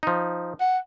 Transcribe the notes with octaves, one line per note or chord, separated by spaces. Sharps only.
F3 D#4
F#5